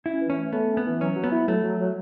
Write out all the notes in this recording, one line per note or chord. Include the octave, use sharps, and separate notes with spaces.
C#4 E4
E3
C#4
A3
A3 B3
C#4
B3
E3
F#3 C#4
F#3
B3
E4
F#3 A3
F#3
F#3